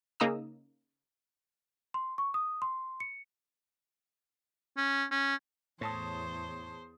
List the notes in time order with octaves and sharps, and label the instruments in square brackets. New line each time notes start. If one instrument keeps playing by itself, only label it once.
[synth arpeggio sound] C#3 A#3 D#4 A#5 D#6 E6
[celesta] C6
C#6
D#6
C6
C#7
[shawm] C#4
C#4
[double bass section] E2 [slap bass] A2 [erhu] C5 [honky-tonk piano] C#5 A5 D#6